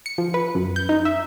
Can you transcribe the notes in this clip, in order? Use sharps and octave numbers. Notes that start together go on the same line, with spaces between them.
C#7
F3
B4
F#2
G6
D#4
E5